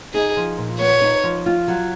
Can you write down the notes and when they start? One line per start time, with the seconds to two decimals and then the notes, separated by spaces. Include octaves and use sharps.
0.14 D#4 G#4
0.37 F3
0.58 A#2
0.80 B3 C#5
1.02 D#4
1.24 F3
1.46 F4
1.68 F#3